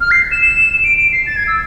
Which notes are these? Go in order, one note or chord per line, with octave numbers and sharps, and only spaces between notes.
F6
C7
E7
E7
D7
D7
C7
A6
G#6
E6